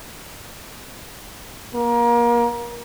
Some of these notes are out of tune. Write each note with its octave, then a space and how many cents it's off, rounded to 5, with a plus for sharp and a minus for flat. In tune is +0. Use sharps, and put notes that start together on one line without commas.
A#3 +30